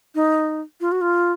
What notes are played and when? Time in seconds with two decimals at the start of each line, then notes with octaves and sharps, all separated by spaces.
0.15 D#4
0.81 F4
0.92 F#4
1.01 F4